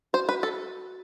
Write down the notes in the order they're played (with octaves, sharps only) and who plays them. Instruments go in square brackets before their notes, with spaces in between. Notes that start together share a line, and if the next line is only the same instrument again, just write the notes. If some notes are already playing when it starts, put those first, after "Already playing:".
[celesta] F#4 [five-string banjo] C5
[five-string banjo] B4
[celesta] F#4
[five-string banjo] A4